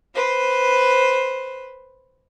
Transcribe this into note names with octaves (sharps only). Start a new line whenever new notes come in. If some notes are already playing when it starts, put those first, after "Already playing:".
B4 C5